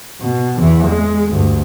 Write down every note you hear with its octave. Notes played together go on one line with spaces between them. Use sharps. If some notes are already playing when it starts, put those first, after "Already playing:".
B2
E2 E3
G#3
D2 G2